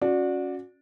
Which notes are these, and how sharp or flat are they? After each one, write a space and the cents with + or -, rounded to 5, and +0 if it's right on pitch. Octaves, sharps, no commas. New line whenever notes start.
C#4 +0 F#4 -25 D5 +0